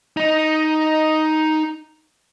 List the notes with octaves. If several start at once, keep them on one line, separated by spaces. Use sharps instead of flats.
D#4 D#5